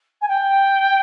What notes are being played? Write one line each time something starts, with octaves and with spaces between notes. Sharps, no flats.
G#5
G5